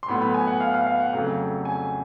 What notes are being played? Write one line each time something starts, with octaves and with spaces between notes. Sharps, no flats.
C6
A2 F#3 B3 B5
B5
G#5
F#5
F5
F5
F5
F#5
F2 C#3 F#3 A3 G5
G#5